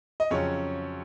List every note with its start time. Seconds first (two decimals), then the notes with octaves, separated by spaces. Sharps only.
0.20 D#5
0.31 F2 C#3 F#3 C#4 C#5